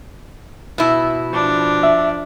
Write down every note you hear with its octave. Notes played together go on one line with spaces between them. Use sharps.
B2 E4
F3 D4
E5